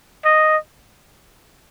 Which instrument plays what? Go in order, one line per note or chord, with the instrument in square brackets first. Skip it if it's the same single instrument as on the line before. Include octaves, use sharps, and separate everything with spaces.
[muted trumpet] D#5